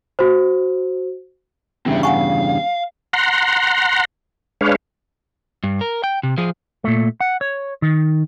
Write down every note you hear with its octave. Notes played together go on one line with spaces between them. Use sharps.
F#4 C5
E2 G2 C#3 C4 E5
F5 F#5 G#5 C#6
F#5 A#5 C6
G#3 D4 B4 C#5 F5
G2
A#4
G5
C3
F3 G#4
A#2 A3
F#5
C#5
D#3